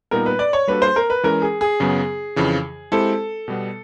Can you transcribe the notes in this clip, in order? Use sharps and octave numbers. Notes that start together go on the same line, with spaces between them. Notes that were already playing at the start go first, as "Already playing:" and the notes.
A#2 G3 B3 D#4 A#4
B4
D5
C#5
G3 A#3 D4 F#4 A4 B4
C5
A#4
B4
E3 G#3 C#4 A#4
G#4
G#4
F#2 C#3 F#3 B3
F2 C#3 E3
G#3 C4 E4 G4 A4 C5
B2 G3 B3